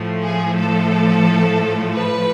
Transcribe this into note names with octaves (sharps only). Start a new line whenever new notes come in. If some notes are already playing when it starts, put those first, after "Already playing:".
Already playing: A2 F3 A3
G#4
A4
B4